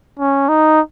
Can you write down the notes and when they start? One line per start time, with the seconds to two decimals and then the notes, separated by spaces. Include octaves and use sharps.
0.19 C#4
0.49 D#4